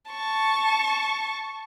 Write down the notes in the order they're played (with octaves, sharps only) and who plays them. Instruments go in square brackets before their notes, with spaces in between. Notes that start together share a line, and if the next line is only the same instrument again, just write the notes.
[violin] A5 C#6